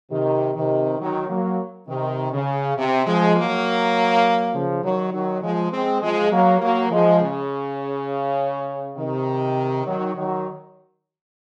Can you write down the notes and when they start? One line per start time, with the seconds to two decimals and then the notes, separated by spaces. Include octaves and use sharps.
0.11 C3 D#3
0.55 C3 D#3
1.00 D#3 F#3
1.29 F#3 A#3
1.88 C3 D#3
2.33 C#3
2.77 C3
3.06 F3 G#3
3.36 F#3 A#3
4.54 C#3 F3
4.83 D#3 F#3
5.13 D#3 F#3
5.42 F3 G#3
5.72 G#3 C4
6.02 F3 G#3
6.31 F#3 A#3
6.61 F#3 A#3
6.90 F3 G#3
7.20 C#3
8.97 C3 D#3
9.86 D#3 F#3
10.15 D#3 F#3